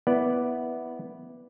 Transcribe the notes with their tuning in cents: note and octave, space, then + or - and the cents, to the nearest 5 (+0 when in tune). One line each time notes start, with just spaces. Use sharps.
B3 +0 E4 -10 D5 +0